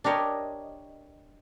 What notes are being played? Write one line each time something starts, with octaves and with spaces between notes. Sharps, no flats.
D4 G4 A#4 C#5 D#5